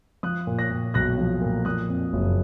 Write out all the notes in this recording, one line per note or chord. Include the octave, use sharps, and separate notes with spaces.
F3 D#6 F#6
A#2
F#6 A#6
A#2
B1 F#6 A#6
F3
A#2
F3 D#6 F#6
F2
F#1